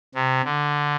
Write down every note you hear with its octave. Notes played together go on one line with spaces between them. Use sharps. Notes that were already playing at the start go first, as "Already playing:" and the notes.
C3
D3